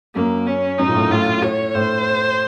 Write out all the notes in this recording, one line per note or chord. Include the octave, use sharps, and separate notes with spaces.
F#2 A#3
C#4
F#2 D#4
A#2
A2
A2 F4
C#5
A2 C5